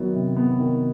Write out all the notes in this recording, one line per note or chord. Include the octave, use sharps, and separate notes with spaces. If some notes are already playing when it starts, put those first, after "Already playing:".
Already playing: D#3 F#3 B3
C3
B3
D#3